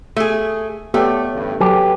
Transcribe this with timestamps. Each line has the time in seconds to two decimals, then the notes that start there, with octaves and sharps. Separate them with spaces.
0.16 A3 G#4
0.94 A3 B3 G4 A4 C#5 D5 G5
1.31 A1 D2 G2
1.61 F#3 G4 A4 B4